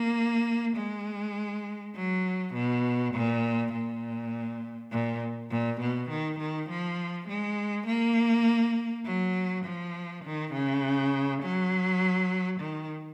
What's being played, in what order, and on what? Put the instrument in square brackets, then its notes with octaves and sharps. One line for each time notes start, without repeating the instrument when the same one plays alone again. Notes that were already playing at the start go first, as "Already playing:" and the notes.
Already playing: [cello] A#3
G#3
F#3
B2
A#2
A#2
A#2
A#2
B2
D#3
D#3
F3
G#3
A#3
F#3
F3
D#3
C#3
F#3
D#3